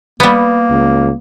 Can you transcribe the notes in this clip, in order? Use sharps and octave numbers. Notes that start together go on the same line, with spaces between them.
G3 A#3 B3
C#2